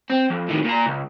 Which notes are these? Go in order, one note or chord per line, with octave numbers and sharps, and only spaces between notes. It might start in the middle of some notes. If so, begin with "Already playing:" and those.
C4
F2
A2 D#3
A#2 A#5
C#2